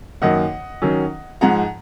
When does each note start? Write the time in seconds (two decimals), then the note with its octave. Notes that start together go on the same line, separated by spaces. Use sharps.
0.22 F#2 D#3 A#3 D#5 F#5
0.82 D#3 F#3 C#4
1.41 G#2 F3 G#3 F#5 A#5